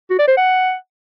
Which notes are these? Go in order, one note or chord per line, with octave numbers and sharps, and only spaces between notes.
F#4
D5
C5
F#5